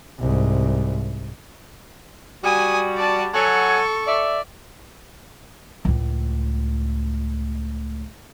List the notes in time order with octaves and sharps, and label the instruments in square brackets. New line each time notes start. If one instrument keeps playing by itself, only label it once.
[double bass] C2 G#2
[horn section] G3 F#4 [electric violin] G#5 D#6
[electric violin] D5 A5
[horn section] F#3 F#5 G#5 [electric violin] A4 C#6
[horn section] D5 E5
[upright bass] C#2 A2